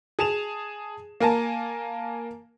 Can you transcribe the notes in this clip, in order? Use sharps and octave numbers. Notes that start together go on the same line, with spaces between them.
G#4 A5 E7 F7
A#3 A#4 G#5 A5